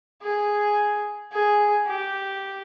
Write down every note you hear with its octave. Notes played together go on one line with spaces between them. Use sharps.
G#4
G#4
G4